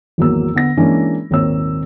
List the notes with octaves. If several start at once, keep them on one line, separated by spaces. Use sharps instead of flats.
G#1 E2 F#3 A#3 E6
D3 B3 A#6
E3 G#3 A#3 C#4 D4
D#1 G#1 A#3 C4 C#5 E6